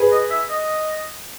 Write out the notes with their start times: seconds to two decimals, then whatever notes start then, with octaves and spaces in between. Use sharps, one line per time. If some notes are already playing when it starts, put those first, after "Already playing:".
Already playing: G#4 B4
0.12 D#5
0.30 E5
0.50 D#5